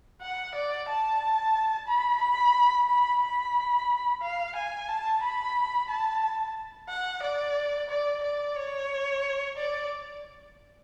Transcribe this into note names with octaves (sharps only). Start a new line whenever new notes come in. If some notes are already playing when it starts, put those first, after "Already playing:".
F#5
D5
A5
B5
B5
B5
B5
F5
G#5
A5
B5
A5
F#5
D5
D5
D5
C#5
D5